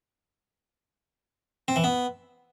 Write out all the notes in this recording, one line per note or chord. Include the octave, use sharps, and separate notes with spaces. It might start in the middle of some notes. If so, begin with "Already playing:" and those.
C4
E3
B3